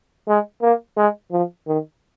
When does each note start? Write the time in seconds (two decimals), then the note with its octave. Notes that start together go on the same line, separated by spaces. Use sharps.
0.28 G#3
0.62 A#3
0.97 G#3
1.32 F3
1.67 D#3